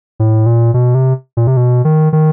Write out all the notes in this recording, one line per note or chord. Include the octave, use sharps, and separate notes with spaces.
A2
A#2
B2
C3
A#2
C3
B2
D#3
D#3